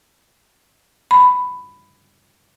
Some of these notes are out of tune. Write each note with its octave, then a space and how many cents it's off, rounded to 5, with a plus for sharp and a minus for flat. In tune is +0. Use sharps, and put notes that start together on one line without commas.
B5 +10